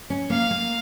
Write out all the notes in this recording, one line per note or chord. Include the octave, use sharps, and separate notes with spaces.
C#4
A#3 F5
A#3